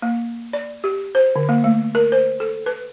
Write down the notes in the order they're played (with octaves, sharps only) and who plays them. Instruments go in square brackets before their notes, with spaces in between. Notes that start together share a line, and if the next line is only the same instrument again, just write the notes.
[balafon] A#3
D5
G4
C5
D3
A#3
A3
A#4
C5
A4
B4